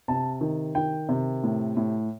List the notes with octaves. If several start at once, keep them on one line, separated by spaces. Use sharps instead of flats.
C3 A5
D#3
D#3 G5
C3
A2
A2